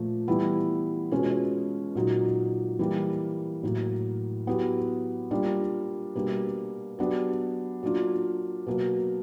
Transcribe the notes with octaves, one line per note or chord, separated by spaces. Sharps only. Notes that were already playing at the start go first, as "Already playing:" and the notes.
Already playing: A#2 F3 A3
E3 G3 B3 E4
B2 G#3 C#4 F4
A#2 F#3 A#3 D#4
E3 G3 A#3
A2 F#3 A#3
F#3 B3 E4 G4
G3 A#3 D4 F4
B2 G3 A#3 D4
F#3 B3 D4 G4
F#3 A#3 D4 F4
B2 F#3 A#3